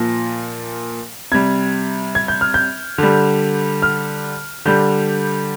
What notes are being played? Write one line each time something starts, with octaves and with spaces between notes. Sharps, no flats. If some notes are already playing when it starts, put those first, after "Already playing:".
Already playing: A#2 F3 A#6
C3 G3 G#6
G#6
G6
F6
G6
D3 G3
F6
D3 G3 G6